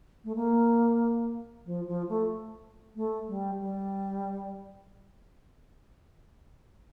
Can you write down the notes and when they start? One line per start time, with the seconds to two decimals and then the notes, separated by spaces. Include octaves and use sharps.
0.24 A3
0.35 A#3
1.66 F3
1.87 F3
2.09 A3
2.96 A3
3.28 G3
3.60 G3